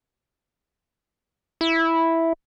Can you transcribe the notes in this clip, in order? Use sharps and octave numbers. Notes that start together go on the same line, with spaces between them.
E4